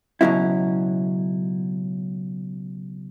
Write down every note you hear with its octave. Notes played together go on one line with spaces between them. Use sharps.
C#2 B2 F#3 C#4 E4